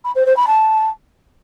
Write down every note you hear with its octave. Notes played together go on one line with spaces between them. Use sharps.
B5
C5
C5
B5
A5